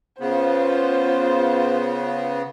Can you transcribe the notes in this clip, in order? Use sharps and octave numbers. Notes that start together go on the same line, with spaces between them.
C#3 B3 F4 C5